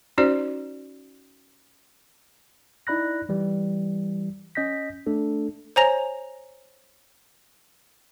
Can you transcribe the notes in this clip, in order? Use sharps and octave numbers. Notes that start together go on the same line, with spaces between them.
C#4 D#4 F#4 C5 D5
D#4 E4 D5 B5 F#6 A#6
E3 G3
C#4 D#5 G6 A#6 B6
A3 D4 A4
C5 C#5 G#5 A#5 A#6 F7